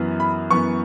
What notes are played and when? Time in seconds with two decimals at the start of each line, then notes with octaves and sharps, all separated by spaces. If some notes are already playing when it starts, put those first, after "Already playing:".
Already playing: F#2 E3 B3
0.20 B5
0.51 F#2 E3 B3 C#6